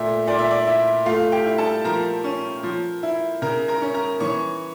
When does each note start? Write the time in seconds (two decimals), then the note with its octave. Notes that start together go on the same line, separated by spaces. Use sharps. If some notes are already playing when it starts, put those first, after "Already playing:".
Already playing: A#2 A3 E5
0.27 A#2 D5
0.39 E5
0.51 D5
0.67 E4 E5
1.06 A3 F4 F5
1.32 G4 G5
1.45 E4
1.58 A4 A5
1.84 F3 A#4 A#5
2.24 C#4
2.63 F3
3.03 E4
3.42 C#3 A#4 A#5
3.68 A#4 A#5
3.82 C#4
3.94 A#4 A#5
4.20 E3 C#5 C#6